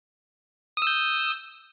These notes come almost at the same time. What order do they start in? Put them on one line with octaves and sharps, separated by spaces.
D#6 E6 G6